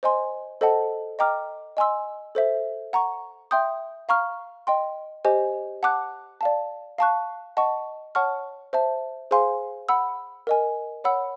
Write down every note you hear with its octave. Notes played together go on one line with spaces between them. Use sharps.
C5 D#5 G#5 C6
A4 C5 D#5 F#5 A5
D#5 G5 A#5 D6 F6
D#5 G#5 C6 E6
A4 C5 E5
F#5 A#5 C#6
E5 G5 C6 D#6 G6
F5 A#5 C#6 F6
D#5 G5 C6
G4 C5 D#5 G#5
F#5 A5 D6 F#6
D5 F5 A5
F5 A5 C#6 F#6
D#5 F#5 A5 C#6
C#5 F#5 A5 C#6 F6
C5 E5 A5
G#4 C5 F5 G#5 C6
F#5 B5 E6
A#4 D#5 G#5
C#5 F#5 B5 E6